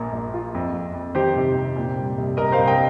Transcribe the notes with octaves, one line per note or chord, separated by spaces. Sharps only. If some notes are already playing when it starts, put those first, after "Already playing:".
Already playing: A#1 A#2 A#3
A#1
F4
F2
F2
F2
D#3 G4 C5
C3
C3
A#2
G3
C2
C2 A#4 D#5
C5 F5
C2
D#5 G5